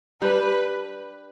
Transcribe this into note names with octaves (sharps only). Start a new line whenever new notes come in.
G3 D4 G4 B4